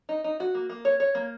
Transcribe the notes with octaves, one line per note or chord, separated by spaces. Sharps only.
D#4
D#4
F#4
A#3
A#3
C#5
C#5
A#3